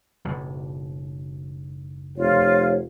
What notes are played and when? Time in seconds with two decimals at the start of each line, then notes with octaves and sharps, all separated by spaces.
0.25 F#1 B1
2.18 F1 F4 C#5